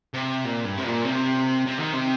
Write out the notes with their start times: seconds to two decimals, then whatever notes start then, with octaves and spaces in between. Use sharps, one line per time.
0.14 C3
0.45 A#2
0.64 G2
0.78 C3
0.84 A#2
1.05 C3
1.66 C3
1.80 D#3
1.93 C3